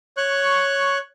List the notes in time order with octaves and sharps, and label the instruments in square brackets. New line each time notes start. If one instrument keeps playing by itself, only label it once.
[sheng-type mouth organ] C#5 C#6 F#6